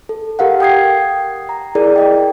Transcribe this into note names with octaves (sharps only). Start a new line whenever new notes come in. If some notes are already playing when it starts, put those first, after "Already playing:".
A4
G4 A#4 F5 F#5
G5 D#6 G#6 C7
A#5
E4 G#4 A#4 D5
D#5 G5